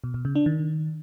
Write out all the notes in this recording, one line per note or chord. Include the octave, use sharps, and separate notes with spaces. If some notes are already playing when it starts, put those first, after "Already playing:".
B2
B2
C#3
D4
D#3